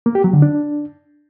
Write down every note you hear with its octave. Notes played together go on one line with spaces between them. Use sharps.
A#3
G4
F#3
D3
D4